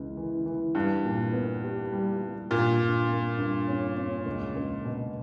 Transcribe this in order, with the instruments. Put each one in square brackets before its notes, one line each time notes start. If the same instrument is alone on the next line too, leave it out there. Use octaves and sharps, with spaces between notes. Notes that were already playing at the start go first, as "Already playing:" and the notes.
Already playing: [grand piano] C#2 E3
E3
E3
[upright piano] G2 [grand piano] G3
[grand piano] A#2
B3
G4
G3
G3
[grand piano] G2 [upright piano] A#2
[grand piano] G2
A#3
G2
C#4
C#4
C#2
C#2
B2